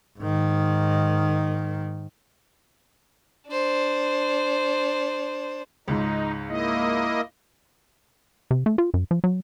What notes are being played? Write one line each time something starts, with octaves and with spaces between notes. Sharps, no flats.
G#2 D#3
D4 C5
C#2 G#2 D#4
A#3 E4 D#5
C3
A3
F4
F#2
F3
F#3